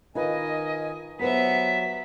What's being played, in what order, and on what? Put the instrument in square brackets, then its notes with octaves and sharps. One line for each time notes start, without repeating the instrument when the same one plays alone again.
[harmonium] D#3 G#5 [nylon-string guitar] D#4 F4 B4 [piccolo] D#5
[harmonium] F#3 [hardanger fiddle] B3 E5 [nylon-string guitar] G4 B4 C5 [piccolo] B6